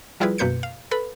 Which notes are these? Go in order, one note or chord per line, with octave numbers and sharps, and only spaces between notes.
F3 G3 E4 F4 G#4 B4
F#2 B2 A#3 B4 G6 C#7
F5
A4 B4 B5